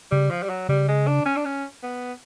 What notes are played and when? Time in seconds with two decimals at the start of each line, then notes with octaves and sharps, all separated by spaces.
0.11 C#3 G3
0.31 F3
0.43 G3
0.49 F#3
0.69 C#3 G3
0.88 G#3
1.07 D4
1.25 C#4
1.37 D4
1.45 C#4
1.83 B3